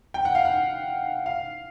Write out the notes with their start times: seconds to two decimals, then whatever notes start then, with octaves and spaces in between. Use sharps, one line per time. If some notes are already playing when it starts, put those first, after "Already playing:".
0.14 G5
0.25 F#5
0.35 F5
0.45 F#5
1.26 F5